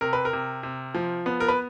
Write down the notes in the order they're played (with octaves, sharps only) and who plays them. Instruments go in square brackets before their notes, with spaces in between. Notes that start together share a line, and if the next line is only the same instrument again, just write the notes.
[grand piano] C3 A#4
B4
A#4
C3
C3
F3
B3
A#4
B4